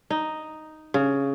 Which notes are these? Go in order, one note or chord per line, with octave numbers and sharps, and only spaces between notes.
D#4
C#3